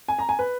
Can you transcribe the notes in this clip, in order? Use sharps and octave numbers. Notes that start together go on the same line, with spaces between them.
G#5
A#5
G#5
B4